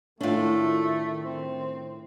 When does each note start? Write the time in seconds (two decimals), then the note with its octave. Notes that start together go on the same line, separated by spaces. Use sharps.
0.21 A2 D#3 A3 C#4 D4 F4
1.24 C4